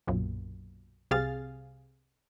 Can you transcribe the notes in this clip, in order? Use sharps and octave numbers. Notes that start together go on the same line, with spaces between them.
B1 F#2 A#2
C2 C3 G#4 F5 F6 A6